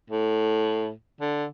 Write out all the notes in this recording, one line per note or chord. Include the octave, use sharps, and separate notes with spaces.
A2
D3